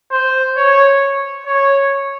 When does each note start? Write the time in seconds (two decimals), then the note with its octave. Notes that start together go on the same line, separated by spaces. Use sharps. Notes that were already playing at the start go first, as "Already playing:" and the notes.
0.11 C5
0.57 C#5
1.46 C#5